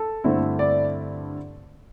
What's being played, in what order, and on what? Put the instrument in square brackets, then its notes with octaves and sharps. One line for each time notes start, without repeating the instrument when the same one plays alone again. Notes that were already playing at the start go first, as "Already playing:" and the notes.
Already playing: [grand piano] A4
G2 D3 A3 C4 E4
D5